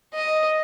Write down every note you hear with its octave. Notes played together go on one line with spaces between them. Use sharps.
D#5